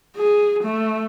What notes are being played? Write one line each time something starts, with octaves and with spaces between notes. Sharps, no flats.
G#4
A3